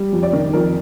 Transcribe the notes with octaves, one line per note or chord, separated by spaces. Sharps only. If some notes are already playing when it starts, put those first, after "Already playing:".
Already playing: G3
F2
D5
D#3
F2 A#4